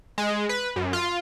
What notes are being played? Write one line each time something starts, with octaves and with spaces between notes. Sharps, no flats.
G#3
B4
F#2
F4